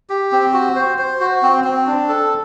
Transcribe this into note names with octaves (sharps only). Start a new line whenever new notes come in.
G4
C4
F#4
C5
C5
F#4
C4
C4
D4
A4